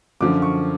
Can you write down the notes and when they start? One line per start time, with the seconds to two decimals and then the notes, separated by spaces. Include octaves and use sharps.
0.21 F#2 D3 F3 D6
0.42 C#6